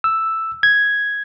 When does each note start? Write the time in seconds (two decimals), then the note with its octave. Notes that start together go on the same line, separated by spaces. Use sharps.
0.04 E6
0.63 G#6